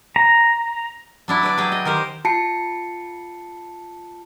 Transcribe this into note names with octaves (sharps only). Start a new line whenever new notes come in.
A#5
F#3 D4 E4
B4 D5
F#3 G#4 G5
D#5
D#3 G4 A#4 C5
F4 A5 C7 C#7